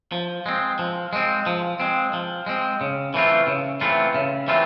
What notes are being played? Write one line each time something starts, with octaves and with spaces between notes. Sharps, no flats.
F3
G#3 C4
F3
G#3 C4
F3
G#3 C4
F3
G#3 C4
C#3
E3 A3 C4 F4
C#3
E3 A3 C4 F4
C#3
E3 A3 C4 F4